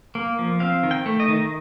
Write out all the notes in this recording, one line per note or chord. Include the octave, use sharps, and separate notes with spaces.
A#3
F3
C4 F5
D#3
G5
A3
D#5
D#3